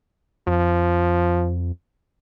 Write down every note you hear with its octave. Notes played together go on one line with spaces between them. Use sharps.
F2 F3